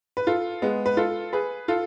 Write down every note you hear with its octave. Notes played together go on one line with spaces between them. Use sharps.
B4
F4 A4
G#3 B3
B4
F4 A4
G#4 B4
F4 A4